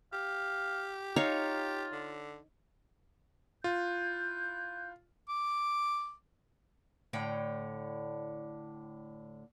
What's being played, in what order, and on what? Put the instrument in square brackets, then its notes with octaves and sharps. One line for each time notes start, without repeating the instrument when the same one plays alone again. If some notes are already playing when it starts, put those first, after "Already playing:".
[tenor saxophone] G4 [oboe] F5
[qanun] D#4 C#5 F5 [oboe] F4
[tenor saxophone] D3
[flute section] E4 F#6 G6 [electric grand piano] F4
[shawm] D6
[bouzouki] A2 D3 G5